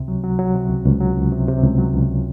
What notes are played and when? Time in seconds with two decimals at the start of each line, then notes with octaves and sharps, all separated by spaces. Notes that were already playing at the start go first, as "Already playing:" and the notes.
Already playing: C#2 C3
0.08 F#3
0.24 F#3
0.39 F#3
0.55 C3
0.70 C#2
0.86 C#2
1.01 F#3
1.16 C#2
1.32 C3
1.48 C3
1.63 C#2
1.78 F#3
1.94 C#2